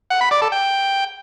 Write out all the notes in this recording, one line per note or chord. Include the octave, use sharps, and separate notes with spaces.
F#5
B5
D5
A4
G5